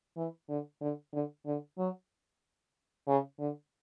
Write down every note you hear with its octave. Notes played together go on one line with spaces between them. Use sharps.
E3
D3
D3
D3
D3
F#3
C#3
D3